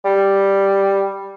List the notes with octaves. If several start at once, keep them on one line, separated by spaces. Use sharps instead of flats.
G3